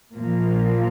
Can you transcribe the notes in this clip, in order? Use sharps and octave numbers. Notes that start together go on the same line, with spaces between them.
A#2 F3 A#3